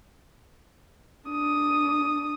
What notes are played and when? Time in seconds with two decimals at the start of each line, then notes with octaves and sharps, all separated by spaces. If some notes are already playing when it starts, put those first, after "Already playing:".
1.28 D4 D#6